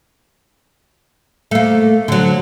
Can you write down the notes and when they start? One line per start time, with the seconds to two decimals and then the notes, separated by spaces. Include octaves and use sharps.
1.51 A3 A#3
2.08 D3 F#3